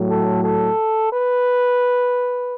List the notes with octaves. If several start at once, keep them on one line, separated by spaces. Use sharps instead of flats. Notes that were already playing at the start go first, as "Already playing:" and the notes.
Already playing: A2 F#3
A4
A4
B4